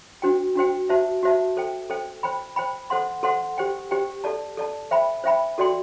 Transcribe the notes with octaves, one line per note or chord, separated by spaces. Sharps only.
D4 F#4 C5 G5
D4 F#4 C5 G5
F#4 C5 E5 A5
F#4 C5 E5 A5
A4 C5 G5
A4 C5 G5
C5 G5 B5
C5 G5 B5
A4 C5 F#5 C6
A4 C5 F#5 C6
G4 C5 G5
G4 C5 G5
A4 D5 A5
A4 D5 A5
C5 E5 G5 B5
C5 E5 G5 B5
F#4 A4 D5 G5 C6